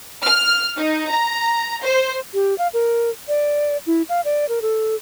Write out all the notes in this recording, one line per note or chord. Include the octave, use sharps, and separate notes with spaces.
F6
D#4
A#5
C5
G4
F5
A#4
D5
E4
F5
D5
A#4
A4